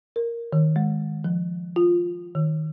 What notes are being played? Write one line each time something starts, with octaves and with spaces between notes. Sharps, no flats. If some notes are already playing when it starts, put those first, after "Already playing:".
A#4
D#3
G#3
F3
F4
D#3